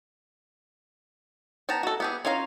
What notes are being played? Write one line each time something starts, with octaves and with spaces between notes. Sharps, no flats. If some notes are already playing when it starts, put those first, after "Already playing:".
B3 G5 A5 A#5
F#4 A4
B3 G4 G#4
C#4 F4 C#5 F5 A#5